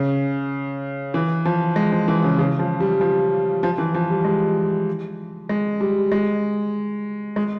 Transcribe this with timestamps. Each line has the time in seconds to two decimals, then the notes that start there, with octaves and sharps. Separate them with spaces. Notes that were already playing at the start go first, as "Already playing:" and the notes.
Already playing: C#3
1.14 E3
1.45 F3
1.76 G#3
1.92 F3
2.08 E3
2.23 C#3
2.39 C#3
2.59 F3
2.80 G3
3.01 F3
3.63 F3
3.78 E3
3.94 F3
4.10 G3
4.25 G#3
5.49 G#3
5.81 G3
6.12 G#3
7.36 G#3